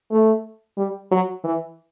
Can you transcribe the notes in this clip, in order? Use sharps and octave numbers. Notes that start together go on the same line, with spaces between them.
A3
G3
F#3
E3